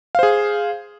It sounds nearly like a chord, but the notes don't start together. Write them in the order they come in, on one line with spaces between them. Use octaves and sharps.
F5 C5 G#4